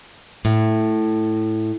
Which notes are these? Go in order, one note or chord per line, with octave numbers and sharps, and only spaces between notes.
A2